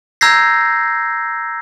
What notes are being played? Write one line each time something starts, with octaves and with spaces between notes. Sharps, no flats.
A#5 E6 G6 G#6 A#6 C7